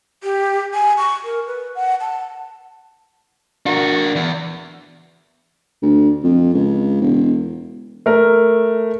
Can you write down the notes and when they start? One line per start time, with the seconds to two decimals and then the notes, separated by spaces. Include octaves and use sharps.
0.23 G4
0.74 G#5
0.98 C#6
1.24 A#4
1.47 B4
1.75 F#5
2.01 A5
3.66 D4 F#4 A#4
4.15 E2
5.82 D2
6.23 F2
6.54 C#2
7.01 E1
8.06 A3 A#4